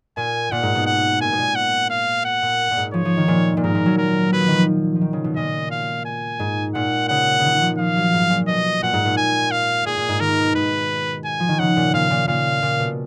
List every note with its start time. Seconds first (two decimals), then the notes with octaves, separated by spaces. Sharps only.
0.17 A#2 G#5
0.51 A#2 F#5
0.63 G#2
0.75 B2
0.86 F#5
1.21 A#2 G#5
1.32 B2
1.38 A#2
1.55 F#5
1.90 F5
2.25 F#5
2.42 A#2
2.71 A#2
2.77 G#2
2.94 F3 C#5
3.05 F3
3.17 D#3
3.28 A#2
3.57 A#2
3.63 G#2 A#4
3.75 A#2
3.86 F#3
3.98 A#4
4.32 F#3 B4
4.40 F3
4.48 D#3
4.55 F3
4.95 F3
5.01 D#3
5.13 C#3
5.24 B2
5.36 A#2 D#5
5.71 F5
6.06 G#5
6.39 G#2
6.75 A#2 F#5
7.09 C#3 F#5
7.39 C#3
7.44 D#3
7.54 D#3
7.61 F3
7.78 F3 F5
7.96 F#3
8.13 G#2
8.30 A#2
8.48 B2 D#5
8.83 A#2 F#5
8.93 G#2
9.05 A#2
9.17 G#5
9.51 F5
9.86 A#2 G#4
9.98 A#2
10.09 G#2
10.20 D#3 A#4
10.38 B2
10.55 G#2 B4
11.25 G#5
11.40 F3
11.49 D#3
11.59 C#3 F#5
11.77 A#2
11.94 A#2 F5
12.10 A#2
12.28 A#2 F5
12.62 A#2
12.80 B2